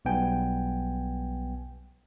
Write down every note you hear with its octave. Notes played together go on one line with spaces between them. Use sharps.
B1 G3 B3 G5 G#5